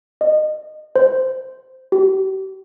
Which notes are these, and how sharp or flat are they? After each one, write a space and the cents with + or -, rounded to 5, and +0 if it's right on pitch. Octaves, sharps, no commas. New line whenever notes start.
D#5 -25
C5 -5
G4 -40